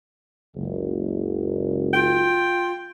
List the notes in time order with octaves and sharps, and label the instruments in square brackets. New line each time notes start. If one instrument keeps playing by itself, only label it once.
[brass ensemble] F#1 C#2
[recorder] F4 [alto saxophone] G5